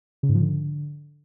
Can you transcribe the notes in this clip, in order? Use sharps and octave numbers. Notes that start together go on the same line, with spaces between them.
C#3
G#2
F3
D3